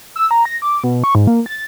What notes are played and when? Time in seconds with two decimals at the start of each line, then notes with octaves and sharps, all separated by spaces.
0.16 E6
0.31 A#5
0.45 A#6
0.62 D6
0.84 B2
1.04 C#6
1.15 G#2
1.27 A#3
1.46 A6